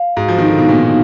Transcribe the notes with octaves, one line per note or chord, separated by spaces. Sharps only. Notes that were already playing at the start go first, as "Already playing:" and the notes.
Already playing: F5
G#2 F#4
F3
D#3 D#4
D3
B2
A#2 B3